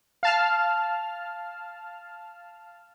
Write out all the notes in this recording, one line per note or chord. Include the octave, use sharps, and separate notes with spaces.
F5 A5 F6